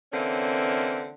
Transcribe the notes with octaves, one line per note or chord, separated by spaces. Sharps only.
D3 E3 A#3 C4 C#4